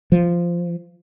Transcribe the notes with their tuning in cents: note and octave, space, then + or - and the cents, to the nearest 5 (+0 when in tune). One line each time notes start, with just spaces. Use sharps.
F3 -10